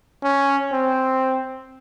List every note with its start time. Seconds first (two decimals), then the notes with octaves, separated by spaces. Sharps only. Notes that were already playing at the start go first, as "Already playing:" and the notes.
0.23 C#4
0.73 C4